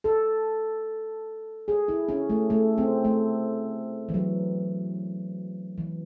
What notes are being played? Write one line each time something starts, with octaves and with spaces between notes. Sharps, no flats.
A4
G#4
E4
C#4
A3
A3
C4
A3
E3
F#3
E3